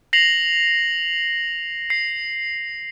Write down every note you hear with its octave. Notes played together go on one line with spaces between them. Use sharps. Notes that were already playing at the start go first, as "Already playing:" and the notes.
A#6 C7 F7 F#7
C7